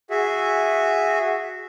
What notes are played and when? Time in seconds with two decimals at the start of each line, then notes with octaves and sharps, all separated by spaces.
0.10 F#4 G#4 E5